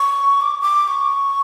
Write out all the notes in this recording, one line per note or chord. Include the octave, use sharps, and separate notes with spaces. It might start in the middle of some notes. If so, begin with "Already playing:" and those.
Already playing: C#6
D6
D6
C#6